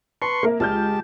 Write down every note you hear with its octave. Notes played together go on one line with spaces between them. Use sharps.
B4 A5 C6 C#6
A#3 A#4 E5
C#2 G#3 G4 A5 F6 G6